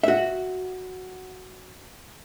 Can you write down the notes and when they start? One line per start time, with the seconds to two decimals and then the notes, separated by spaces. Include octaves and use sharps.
0.03 F#4 E5